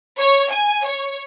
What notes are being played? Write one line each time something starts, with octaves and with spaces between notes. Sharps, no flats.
C#5
G#5
C#5